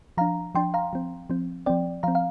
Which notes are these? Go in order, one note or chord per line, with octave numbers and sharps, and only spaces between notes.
F3 D4 F5 A#5
F3 D4 G5 C6
F5 A#5
F3 C4
F3 C4
F3 C4 D5 G5
F3 C4 F5 A#5
F5